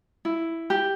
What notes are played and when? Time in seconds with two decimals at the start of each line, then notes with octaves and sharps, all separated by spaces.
0.25 E4
0.70 G4